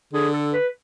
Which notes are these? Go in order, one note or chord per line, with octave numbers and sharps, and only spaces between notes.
D3 G#4
A4
B4